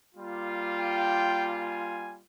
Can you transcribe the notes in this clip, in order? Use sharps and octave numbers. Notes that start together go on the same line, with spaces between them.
G3 A#3 F4
G5
G#5